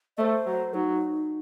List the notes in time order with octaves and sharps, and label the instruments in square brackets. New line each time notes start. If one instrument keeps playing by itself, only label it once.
[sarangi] A3 [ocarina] C5 D#5
[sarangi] F#3
[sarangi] F#3 [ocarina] D#4